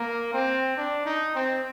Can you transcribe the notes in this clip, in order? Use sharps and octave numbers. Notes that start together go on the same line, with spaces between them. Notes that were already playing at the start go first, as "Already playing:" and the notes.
Already playing: A#3
C4
D4
D#4
C4